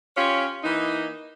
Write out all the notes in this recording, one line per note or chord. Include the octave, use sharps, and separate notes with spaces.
C#4 F4 G4 C#5
E3 A#3 D#4